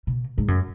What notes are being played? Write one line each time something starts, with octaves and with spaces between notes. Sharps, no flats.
B2
G#2
F#2